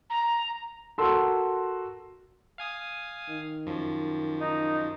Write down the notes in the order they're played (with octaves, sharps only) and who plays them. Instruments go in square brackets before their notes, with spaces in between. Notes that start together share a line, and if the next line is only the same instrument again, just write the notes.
[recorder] A#5
[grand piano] F#4 A4 A#4 A5 C6 E6
[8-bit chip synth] F5 G#5 D#6
[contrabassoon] D#3
[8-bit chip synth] F#2 F3
[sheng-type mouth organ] D#4